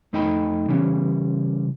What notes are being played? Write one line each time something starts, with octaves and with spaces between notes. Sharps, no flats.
F2 A3 D#4 D#5 G5 B5
C#3 E3 G3 C#4